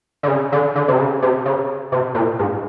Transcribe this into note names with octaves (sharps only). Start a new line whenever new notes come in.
D3
C#3
D3
D3
C3
C#3
C3
C#3
C3
A#2
G#2